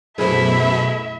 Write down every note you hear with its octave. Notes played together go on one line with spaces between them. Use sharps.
F#2 B2 A3 E4 G#4 C5 E5